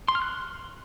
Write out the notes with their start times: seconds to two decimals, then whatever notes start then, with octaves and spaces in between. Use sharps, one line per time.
0.08 C6
0.15 F6
0.22 F#6